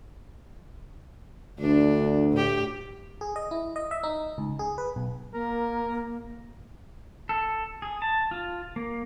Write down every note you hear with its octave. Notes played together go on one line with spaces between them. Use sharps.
D2 D4
A2 G4
G#4
D#5
E4
D#5
E5
D#4
C#2
G#4
B4
B1
A#3 A#4
A4
G#4
A5
F4
A#3